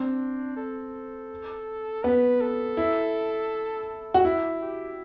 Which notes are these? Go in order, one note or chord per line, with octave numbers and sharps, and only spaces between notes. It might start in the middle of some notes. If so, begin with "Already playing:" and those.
Already playing: C4 D4
A4
B3 B4
A4
E4
F#4
E4
G4